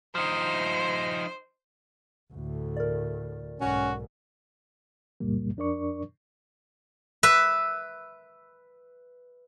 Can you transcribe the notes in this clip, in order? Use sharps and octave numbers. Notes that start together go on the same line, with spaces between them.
F3 D#4 C5
D2 A2
A#4 D5
B1 G#2 C#4 F#4
C#2 F#2 A#2 G3 A#3
F2 D4 A#4 D5 C#6
B4 E5